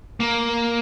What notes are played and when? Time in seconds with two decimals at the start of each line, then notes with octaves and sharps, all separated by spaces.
0.20 A#3